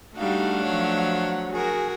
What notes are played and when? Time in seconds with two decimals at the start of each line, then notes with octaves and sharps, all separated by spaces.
0.17 G3 A3 D4 D#4 F#4 F5 F#5
0.63 F3 F#3 C#5
1.52 F#4 G#4 A#4